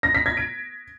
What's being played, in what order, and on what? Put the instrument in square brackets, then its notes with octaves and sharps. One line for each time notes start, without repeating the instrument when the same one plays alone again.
[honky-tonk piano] A#6
B6
G#6
D7